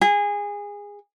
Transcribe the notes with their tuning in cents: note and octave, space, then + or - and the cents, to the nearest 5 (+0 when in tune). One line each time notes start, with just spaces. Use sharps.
G#4 -20